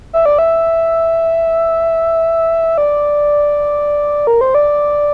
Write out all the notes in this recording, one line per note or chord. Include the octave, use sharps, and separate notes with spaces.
E5
D5
E5
D5
A#4
C5
D5